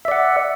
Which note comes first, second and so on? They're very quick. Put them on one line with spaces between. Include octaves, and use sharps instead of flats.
E5 D5 F#5